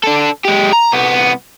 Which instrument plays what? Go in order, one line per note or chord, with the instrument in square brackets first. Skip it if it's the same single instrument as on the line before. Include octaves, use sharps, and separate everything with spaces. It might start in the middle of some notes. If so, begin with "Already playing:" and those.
[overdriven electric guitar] D4 A4
G#3 G4
A#5
C2 B3